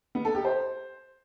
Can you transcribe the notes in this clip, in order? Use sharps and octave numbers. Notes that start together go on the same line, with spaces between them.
B3
A4
G4
C5